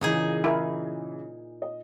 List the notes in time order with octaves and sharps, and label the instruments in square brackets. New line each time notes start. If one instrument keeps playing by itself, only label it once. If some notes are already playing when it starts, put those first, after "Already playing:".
[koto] A#2 D#4 G#4 [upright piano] C#3 E3
[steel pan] E4 A#4 G#5
[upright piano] D#5